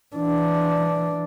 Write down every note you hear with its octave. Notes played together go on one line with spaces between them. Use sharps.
E3 D4